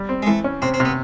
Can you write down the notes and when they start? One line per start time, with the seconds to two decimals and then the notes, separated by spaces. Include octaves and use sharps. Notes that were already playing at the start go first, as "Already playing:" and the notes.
Already playing: G3
0.09 C4
0.22 G#3
0.26 E3 A3
0.44 C#4
0.62 C3 C4
0.74 C4
0.80 C3
0.85 B3